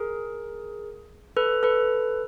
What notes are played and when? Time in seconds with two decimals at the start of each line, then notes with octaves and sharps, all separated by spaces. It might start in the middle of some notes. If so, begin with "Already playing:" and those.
Already playing: G#4 A#4
1.37 A4 B4
1.63 A4 B4